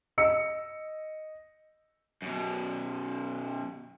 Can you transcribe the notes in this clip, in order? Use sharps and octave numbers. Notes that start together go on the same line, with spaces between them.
D#5 E6 C#7
F#2 B2